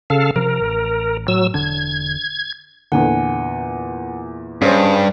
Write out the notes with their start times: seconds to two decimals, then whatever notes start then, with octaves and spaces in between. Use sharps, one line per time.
0.10 C#3 A4 F5
0.36 C3 F3 A#4
0.61 A1
1.28 A2 F#3 E6
1.54 E1 D3 D4 G#6
2.92 E2 A#2 D3 F#5 G#5
4.62 G2 C#4 G#4 C5